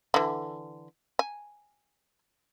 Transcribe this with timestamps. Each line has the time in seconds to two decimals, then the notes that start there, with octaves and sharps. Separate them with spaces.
0.14 D3 E3
1.19 G#5